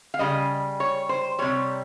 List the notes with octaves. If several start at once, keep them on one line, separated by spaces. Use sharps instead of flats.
F5
C#3 G3 D#5
C#5
C5
C3 G3 C#5